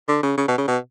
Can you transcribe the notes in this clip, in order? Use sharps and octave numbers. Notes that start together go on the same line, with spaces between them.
D3
C#3
C#3
B2
C#3
B2